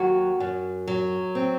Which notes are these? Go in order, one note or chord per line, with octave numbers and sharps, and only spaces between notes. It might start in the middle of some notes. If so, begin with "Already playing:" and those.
Already playing: D#2 F#3 F#4
F#2
F#3
C4